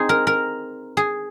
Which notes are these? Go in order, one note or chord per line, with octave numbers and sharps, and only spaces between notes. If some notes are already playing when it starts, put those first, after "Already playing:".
Already playing: C4 D#4 G#4
A#4
A#4
G#4